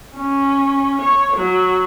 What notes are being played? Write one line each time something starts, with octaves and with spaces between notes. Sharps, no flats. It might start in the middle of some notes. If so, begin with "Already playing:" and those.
C#4
C#5
F#3